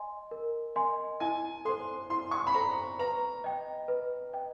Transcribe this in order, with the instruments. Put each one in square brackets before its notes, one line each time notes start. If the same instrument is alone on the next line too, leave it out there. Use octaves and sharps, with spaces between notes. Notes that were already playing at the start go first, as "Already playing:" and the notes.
Already playing: [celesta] D#5 G#5 C6
A#4
D#5 G#5 C6
[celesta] E4 [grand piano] G#5
[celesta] A4 C5 [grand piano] C6
[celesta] E4 [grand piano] C6
[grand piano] C#6
B5
[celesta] A4 C5 [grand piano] A#5
[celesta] B4 [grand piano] A#5
[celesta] D#5 G5
B4
D#5 G5